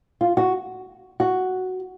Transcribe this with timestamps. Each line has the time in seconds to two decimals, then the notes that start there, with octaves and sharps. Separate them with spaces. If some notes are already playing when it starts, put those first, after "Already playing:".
0.21 F4
0.37 F#4
1.20 F#4